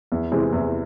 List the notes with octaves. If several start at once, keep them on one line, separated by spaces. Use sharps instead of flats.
E2
C3 E3 G#3 C4
E2